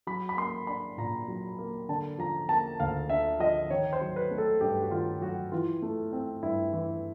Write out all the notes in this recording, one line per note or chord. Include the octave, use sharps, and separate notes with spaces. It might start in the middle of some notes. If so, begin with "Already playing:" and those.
F#3 B5
B5
A#3 C6
D4 B5
A#2 A#5
F#3
A#3
D3 A5
F3 A#5
A#3 A5
D2 F5
D3 E5
F3 D#5
D#3 C#5
C5
F#3
B4
A3
A4
G2 G4
F#4
D#3 F4
F#3 F#4
E3 F4
A3
C4
G2 E4
E3